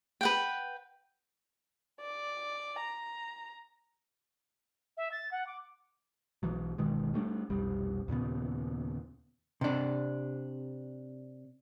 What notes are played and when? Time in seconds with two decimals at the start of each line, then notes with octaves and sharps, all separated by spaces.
0.21 B4 F#5 G5
2.01 D5
2.81 A#5
4.97 E5
5.12 A6
5.31 F#5
5.47 D6
6.43 B1 E3 F#3
6.78 G1 B2 D#3 G#3
7.14 G3 A3 C#4 D4
7.50 F1 B1 G3
8.08 D#2 A#2 C#3 B3
9.61 C3 D4